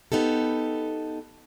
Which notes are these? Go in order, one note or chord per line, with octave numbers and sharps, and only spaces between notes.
B3 D#4 G4 A4